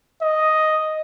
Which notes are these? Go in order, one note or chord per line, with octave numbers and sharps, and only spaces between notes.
D#5